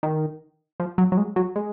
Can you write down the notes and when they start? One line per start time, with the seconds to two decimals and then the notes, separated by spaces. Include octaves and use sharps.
0.03 D#3
0.80 F3
0.98 F#3
1.12 F#3
1.17 G#3
1.36 F#3
1.56 G#3